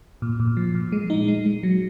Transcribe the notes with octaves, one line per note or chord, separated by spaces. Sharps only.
A#2
A#2
F3
A#2
G#3
D#4
G#3
G#3
F#3